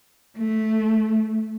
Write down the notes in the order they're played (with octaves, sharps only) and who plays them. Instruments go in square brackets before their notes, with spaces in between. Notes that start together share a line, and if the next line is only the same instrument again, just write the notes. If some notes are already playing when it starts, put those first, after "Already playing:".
[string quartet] A3